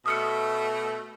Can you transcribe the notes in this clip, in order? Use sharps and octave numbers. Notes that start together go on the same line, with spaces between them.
B2 A3 D#6 F6 C#7